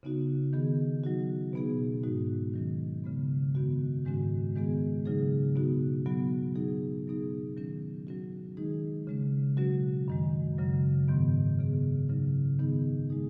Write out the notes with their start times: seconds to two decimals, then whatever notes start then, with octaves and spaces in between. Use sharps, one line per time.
0.03 C#3 B3 D#4 F#4
0.53 D#3 B3 G#4
1.04 F#3 D#4 F#4
1.53 B2 B3 D#4 G#4
2.03 G#2 G#3 D#4 F#4
2.54 D#3 F#3 C#4
3.04 C#3 G#3 B3
3.55 F#2 D#3 B3 F#4
4.05 G#2 D#3 G#3 C#4 F#4
4.55 D#3 G#3 B3 G#4
5.06 C#3 F#3 D#4 G#4
5.55 B2 B3 D#4 F#4
6.06 F#3 B3 F#4
6.56 F#3 D#4 G#4
7.06 B2 F#3 B3 D#4 G#4
7.57 D#3 F#3 C#4
8.07 F#3 C#4 F#4
8.57 D#3 G#3 D#4 G#4
9.07 C#3 G#3 C#4
9.57 B2 F#3 C#4 F#4
10.08 F#2 D#3 G#3
10.58 F#2 C#3 F#3
11.08 G#2 D#3 F#3 B3
11.59 C#3 B3 G#4
12.09 C#3 F#3 D#4
12.59 D#3 B3 D#4 G#4
13.10 D#3 G#3 D#4 G#4